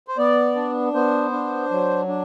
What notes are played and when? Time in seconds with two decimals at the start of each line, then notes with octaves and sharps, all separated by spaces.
0.08 C5
0.18 B3 D5
0.56 D4
0.94 B3 C5
1.32 D4
1.71 F#3
2.08 D4